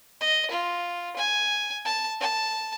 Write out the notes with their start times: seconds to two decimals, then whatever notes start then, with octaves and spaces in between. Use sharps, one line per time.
0.21 D#5
0.51 F4
1.17 G#5
1.85 A5
2.21 A5